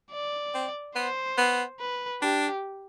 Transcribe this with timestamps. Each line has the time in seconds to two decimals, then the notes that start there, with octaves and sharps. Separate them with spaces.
0.12 D5
0.54 C4
0.96 B3 C5
1.38 B3
1.80 B4
2.22 D4 G4